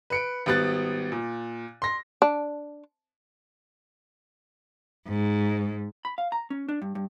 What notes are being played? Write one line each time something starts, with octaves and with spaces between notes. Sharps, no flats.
B4 C#7 D7
G#1 G3 B3 F#6 A6
A#2
C6 A#6
D4
G#2
B5
F5
A#5
C#4
D4
G2
G2